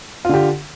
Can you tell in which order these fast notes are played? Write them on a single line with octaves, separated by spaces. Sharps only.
F4 D3 G4